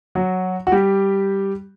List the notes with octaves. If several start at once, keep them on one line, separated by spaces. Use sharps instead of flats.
F#3 F#4
F#4
G3 G4